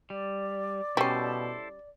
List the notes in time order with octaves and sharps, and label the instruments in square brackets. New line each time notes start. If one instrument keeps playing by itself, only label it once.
[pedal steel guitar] G3 [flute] D5
[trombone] B2 [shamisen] G3 C#4 [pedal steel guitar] E4 A4 C5